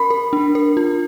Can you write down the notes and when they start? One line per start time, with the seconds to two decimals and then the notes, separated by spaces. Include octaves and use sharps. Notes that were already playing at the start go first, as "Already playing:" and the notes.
Already playing: A#4 B5
0.10 A#4
0.33 D4
0.55 A#4
0.77 F4